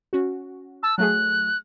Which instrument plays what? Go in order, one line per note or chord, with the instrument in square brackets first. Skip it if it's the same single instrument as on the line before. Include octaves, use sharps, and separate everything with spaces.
[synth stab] C#4 F#4
[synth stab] A5 [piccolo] E6
[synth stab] F#3 A3 G#4 [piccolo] F#6